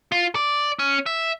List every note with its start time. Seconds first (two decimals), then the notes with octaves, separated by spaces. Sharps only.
0.12 F4
0.35 D5
0.79 C#4
1.06 E5